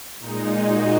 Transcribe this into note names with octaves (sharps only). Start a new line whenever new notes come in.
A#2 G#3 D#4
D#4 F#4